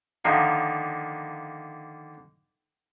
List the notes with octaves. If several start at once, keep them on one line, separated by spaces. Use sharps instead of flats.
D3 D#3 F3 A#3